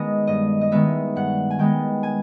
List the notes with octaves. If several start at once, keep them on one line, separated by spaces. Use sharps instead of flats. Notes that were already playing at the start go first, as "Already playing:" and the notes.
Already playing: D#3 G#3 B3 D#5
G2 D#5
D#5
D#3 G#3 B3 E5
G2 F#5
G#5
D#3 G#3 B3 G5
G#5